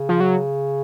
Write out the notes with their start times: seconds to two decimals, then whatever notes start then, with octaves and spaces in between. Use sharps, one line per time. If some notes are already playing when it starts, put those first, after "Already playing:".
Already playing: C#3
0.09 F3
0.20 F#3